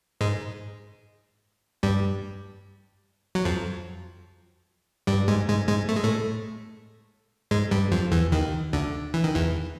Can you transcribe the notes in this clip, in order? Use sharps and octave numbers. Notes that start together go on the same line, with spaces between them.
G#2 G#3
G2 G3
F#3
F2 F3
G2 G3
G#2 G#3
G#2 G#3
G#2 G#3
A3
G#3
A2 A3
G#2 G#3
G2 G3
F2 F3
E2 E3
D#2 D#3
D2 D3
E3
D#3
E2 E3